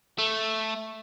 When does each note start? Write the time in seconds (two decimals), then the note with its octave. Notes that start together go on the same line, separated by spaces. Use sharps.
0.18 A3